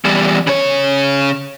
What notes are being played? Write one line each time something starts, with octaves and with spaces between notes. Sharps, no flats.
E2 G3
C#3 C#5